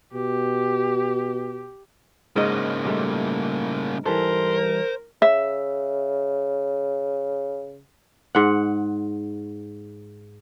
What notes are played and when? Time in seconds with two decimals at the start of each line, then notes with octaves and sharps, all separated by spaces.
0.14 B2 G4
2.36 G#2 C#3 A#3 D#5
2.85 A#2 G3 A3
4.06 E3 G3 A4 A#4 C5
5.22 C#3 E5
8.35 G#2 F#5